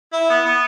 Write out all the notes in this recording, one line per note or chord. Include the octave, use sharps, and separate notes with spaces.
E4
B3
B3